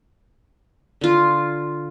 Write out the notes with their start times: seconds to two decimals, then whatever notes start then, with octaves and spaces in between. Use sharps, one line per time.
1.01 D3 F4